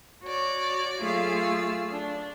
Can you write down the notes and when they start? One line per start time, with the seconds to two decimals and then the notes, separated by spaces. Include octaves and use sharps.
0.25 F#4 C#5 D5
1.01 F#3 A3 F4 G#4 F5 E6
1.91 D4